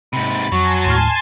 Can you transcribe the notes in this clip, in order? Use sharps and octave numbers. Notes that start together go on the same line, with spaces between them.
G#2 C3 B5 A6
F2 F#3 F#4 G#5 A5 C6 C#6
D#2 A2 F6